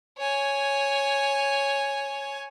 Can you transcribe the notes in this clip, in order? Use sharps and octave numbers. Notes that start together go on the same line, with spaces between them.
C#5 G#5